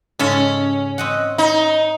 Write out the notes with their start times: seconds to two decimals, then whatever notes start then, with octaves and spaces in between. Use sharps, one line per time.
0.19 G#2 C#3 C#4 A4
0.98 C4 D#5 F#5
1.38 D#4